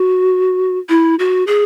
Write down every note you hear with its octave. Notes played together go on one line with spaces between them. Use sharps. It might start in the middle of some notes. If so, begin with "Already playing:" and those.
Already playing: F#4
E4
F#4
G#4